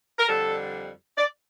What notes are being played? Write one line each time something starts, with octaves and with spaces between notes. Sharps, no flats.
A#4
F2 D3 G3 A4
D5